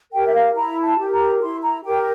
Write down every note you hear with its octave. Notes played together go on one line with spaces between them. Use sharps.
G4 A#4 G5
E5
F5
E4 A#5
A5
G4 A#4
A#5
E4 C6
A#5
G4 A#4 G5